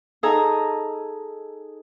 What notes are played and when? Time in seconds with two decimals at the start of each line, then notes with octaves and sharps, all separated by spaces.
0.23 D#4 G#4 A4 D#5 G#5 A#5